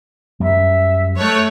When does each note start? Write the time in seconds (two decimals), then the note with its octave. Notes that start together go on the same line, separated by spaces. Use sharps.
0.40 F#2 G3 E5
1.19 A3 C#5 A5 F#6